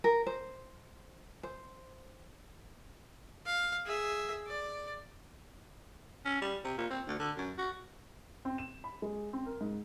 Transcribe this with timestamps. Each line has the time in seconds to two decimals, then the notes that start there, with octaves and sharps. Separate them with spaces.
0.04 A#4
0.27 C5
1.43 C5
3.46 F5
3.86 G#4 E5
4.47 D5
6.25 C#4
6.42 G3
6.64 C3
6.78 A#2
6.90 C4
7.07 D2
7.19 D3
7.37 F#2
7.58 F#4
8.45 C4
8.58 E7
8.84 B5
9.02 G#3
9.33 C4
9.46 A#4
9.61 G#2